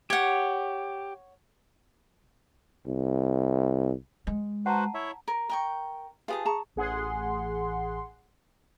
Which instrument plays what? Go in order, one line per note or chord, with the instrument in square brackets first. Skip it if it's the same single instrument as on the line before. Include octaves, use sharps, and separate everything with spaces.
[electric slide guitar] G4 [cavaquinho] C#5 F#5
[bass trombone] C2
[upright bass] G#3
[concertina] F#4 B4 C5 [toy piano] F#5 A5 A#5
[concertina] E4 C#5 E5
[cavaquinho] A#4
A#4 G5 C#6
[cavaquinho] F4 G#4 A5 [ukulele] G4 B4 F5
[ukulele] G#4 A5 A#5 [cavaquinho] C#6
[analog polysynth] A1 G#4 F#5 C6